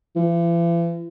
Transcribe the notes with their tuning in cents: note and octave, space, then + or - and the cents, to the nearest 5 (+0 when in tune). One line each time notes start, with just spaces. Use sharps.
E3 +45